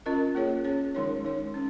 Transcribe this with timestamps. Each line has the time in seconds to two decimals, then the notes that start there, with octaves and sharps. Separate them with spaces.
0.06 C#4 F4 A#4 D#5
0.35 A#3 F4 G#4 C#5
0.64 C#4 G#4 C#5
0.95 D#3 G#3 D#4 A#4 C#5
1.24 G#3 D#4 C#5
1.54 C#4